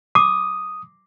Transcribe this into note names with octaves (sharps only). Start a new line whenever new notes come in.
D6 D#6